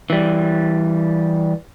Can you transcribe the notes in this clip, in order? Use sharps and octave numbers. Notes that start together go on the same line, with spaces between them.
E3 G3